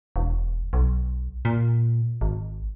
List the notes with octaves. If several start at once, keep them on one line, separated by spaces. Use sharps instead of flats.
E1
B1
A#2
G#1